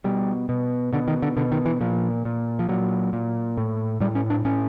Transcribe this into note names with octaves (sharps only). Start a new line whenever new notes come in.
B2 G3
B2
B2 D3
D#3
D3
B2 D3
D#3
E3
A#2 F3
A#2
F3
A#2 F#3
A#2
A2
A2 G3
C#4
D4
A2 C#4